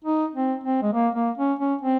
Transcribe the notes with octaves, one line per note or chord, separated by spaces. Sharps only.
D#4
C4
C4
G#3
A#3
A#3
C#4
C#4
C4